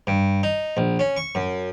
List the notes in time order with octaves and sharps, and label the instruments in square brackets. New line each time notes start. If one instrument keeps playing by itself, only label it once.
[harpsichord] G2
D#4
A#1
C#4
C#6
F#2